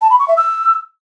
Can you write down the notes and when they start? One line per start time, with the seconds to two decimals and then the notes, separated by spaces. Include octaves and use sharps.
0.01 A5
0.10 B5
0.19 C#6
0.28 E5
0.37 E6